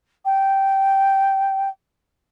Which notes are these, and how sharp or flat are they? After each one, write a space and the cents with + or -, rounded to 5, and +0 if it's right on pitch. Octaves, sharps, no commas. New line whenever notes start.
G5 -10